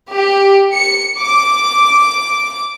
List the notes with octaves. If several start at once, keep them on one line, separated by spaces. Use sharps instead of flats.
G4
C#7
D6